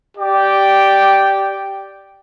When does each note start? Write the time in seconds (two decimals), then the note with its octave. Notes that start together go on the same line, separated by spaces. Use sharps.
0.17 G4 D5 G5